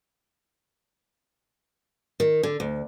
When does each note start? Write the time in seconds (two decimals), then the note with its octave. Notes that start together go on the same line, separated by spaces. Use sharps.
2.20 D#3
2.43 D3
2.60 D2